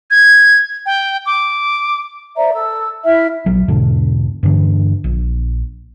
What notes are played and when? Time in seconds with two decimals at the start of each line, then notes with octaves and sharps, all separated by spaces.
0.11 G#6
0.86 G5
1.26 D6
2.36 C5 D5 E5 A#5
2.53 A4 E6
3.05 E4 E5 F6
3.46 A#1 F#3
3.68 E2 G#2 B2 D3
4.43 G2 D3 E3
5.04 A#1